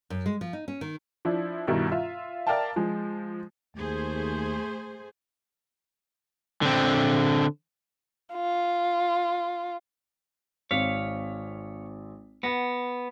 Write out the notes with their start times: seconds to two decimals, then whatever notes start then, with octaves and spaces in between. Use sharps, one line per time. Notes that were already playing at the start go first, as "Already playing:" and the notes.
0.10 F#2
0.26 G#3
0.41 F3
0.53 D#4
0.68 C#4
0.81 D#3
1.25 F3 D4 E4
1.68 G2 B2 D#3 G3 E4
1.91 F4 E5 F5
2.47 A#4 D5 E5 F5 G5 A5
2.76 F3 G#3
3.76 D#2 A3 G#4 C5
6.62 D3 C4
8.34 F4
10.71 G#1 C4 C#5 F5 B6
12.43 B3 F#5 A#6